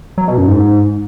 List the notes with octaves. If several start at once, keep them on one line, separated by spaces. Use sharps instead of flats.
F#3
B2
F#2
G#2